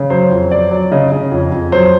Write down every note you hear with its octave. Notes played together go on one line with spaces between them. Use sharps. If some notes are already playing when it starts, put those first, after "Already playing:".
Already playing: C#3
F#3 C5
F2
F#3 D5
F#3
C#3 D#5
C#3
F2
F2
F#3 C5